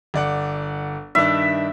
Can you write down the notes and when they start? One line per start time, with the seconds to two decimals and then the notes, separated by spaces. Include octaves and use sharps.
0.14 G1 D5 F#5
1.15 G2 D#3 D4 E5